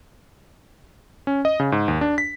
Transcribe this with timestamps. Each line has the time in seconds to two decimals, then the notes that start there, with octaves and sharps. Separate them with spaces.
1.27 C#4
1.45 D#5
1.60 C#3
1.72 G#2
1.88 D#2
2.01 D4
2.18 B6